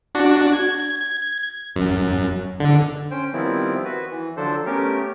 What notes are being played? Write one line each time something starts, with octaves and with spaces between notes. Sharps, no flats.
D4 F#4
G#6
F#2
D3
C#4 C5 G5
D#3 F3 G3 B3 C4 E4
F#4 B4
E3
D3 F3 F#3 D4 A4 C5
A3 B3 C#4 G4 A#4